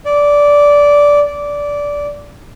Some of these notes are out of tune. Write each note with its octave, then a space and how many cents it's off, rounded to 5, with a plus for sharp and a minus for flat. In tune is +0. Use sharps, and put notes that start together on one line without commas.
D5 -10
D5 -15